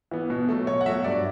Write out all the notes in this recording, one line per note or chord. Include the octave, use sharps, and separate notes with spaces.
E3 B3
B2
F#3 A3
B2 C#5
F#5
F#3 A3 E5
G2 D5